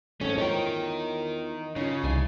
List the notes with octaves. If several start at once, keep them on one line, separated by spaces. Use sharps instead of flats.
G#2 D#3 F3 A3 C4 C#4 A4
E2 D#4 F4 A#4 C#5 G5
C#3 C#4 D#4 F4
C2 E3 G3 D#4 D5 G#5